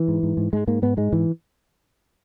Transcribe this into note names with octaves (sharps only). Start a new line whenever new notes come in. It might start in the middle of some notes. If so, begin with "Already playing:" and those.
Already playing: E3
G#2
G#2
G#2
G#2 G#3
G#2 A#3
G#2 B3
G#2 G#3
G#2 E3